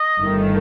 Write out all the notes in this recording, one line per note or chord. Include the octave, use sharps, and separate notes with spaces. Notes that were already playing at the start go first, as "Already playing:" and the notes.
Already playing: D#5
G1 G2 D#3 A3